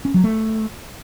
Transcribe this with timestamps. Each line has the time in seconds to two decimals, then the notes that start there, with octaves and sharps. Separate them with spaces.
0.05 C#4
0.14 F#3
0.24 A3